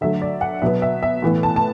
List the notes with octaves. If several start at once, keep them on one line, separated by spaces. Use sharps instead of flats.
D3 F#3 A3 E5
D5
F#5
B2 F#3 B3 E5
E5
E5
A2 E3 B3
A5
A5